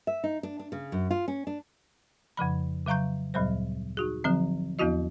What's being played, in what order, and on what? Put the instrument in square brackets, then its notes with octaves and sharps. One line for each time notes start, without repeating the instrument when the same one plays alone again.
[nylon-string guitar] E5
D#4
D4
D4
C#3
F#2
F4
C#4
D4
[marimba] F2 C#3 F3 B5
C#3 F#3 F5 A#5 C#6 G6
D2 A#2 F#3 G3 C5
D#4 F#4 G#4
D3 F3 F#3 C4
E2 F3 B3 E4 F#4 D#5